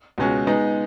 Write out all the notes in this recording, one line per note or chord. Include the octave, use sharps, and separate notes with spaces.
C#2 B2 G#3 C#4 F#4
G#3 B3 D#4